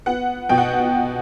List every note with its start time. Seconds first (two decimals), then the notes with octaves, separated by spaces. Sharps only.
0.06 B3 F#5
0.49 B2 G5
0.58 F#5